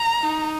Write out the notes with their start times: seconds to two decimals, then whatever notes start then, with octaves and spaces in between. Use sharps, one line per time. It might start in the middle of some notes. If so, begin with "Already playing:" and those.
Already playing: A#5
0.23 D#4